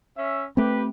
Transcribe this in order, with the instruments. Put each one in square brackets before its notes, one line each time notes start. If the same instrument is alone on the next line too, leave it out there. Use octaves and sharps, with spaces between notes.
[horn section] C#4 E5
[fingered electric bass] A3 C4 [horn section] G4 B4